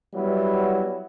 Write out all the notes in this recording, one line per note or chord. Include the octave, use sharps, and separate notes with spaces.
F#3 G3 B3 E4